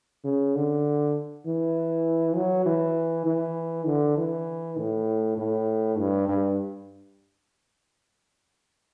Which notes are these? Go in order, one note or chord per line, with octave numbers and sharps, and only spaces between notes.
C#3
D3
E3
F#3
E3
E3
D3
E3
A2
A2
G2
G2